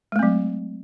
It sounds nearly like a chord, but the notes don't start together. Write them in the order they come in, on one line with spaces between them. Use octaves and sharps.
G#3 A3 C4 F#3